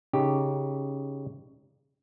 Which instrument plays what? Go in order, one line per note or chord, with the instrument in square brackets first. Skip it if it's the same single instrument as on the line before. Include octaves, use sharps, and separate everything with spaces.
[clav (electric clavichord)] C#3 D#4 G4